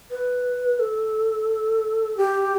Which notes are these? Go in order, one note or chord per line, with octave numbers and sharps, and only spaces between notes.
B4
A4
G4